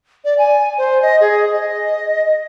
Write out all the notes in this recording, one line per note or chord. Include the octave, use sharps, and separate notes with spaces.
D5
G#5
C5
D#5
G#4
D#5